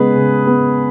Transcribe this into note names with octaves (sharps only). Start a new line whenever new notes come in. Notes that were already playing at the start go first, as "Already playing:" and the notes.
Already playing: C#3 G#3 B3 G#4 B4
C#3
G#3 B3